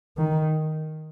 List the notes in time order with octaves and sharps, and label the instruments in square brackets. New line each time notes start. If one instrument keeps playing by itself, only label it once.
[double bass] D#3